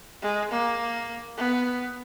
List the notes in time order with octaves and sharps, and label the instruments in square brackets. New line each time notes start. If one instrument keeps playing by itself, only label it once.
[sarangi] G#3
A#3
B3